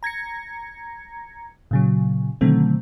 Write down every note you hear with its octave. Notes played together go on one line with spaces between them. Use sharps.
A#5 G#6 A#6 C#7
A#2 C#3 F#3
B2 D3 D#3 F#3 A3 C4